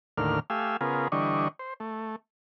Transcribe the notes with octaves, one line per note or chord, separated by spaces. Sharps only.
D#2 A2 D3 A#3 F6
A3 G4 F5 G#5 E6
C#3 B3 F4 G#4 A#4
D3 E3 G3 D4 D#5 C#6
C5
A3